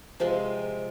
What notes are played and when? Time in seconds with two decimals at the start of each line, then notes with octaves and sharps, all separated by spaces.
0.20 C3 F3 G#3 C4